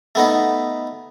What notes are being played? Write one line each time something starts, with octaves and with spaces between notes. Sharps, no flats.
A3 B3 D#4